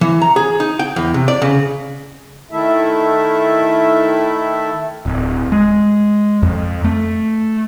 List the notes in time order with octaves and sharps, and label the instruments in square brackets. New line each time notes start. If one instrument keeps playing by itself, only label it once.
[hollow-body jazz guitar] E3
A#5
G#4
D#4
G5
E2
C3
D5
C#3
[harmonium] D#3 A3 E4 A4 E5
[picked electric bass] D1
G#3
F2
A3